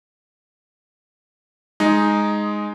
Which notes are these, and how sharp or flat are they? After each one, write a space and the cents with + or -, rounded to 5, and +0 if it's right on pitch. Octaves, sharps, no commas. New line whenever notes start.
G#3 +0 D#4 +0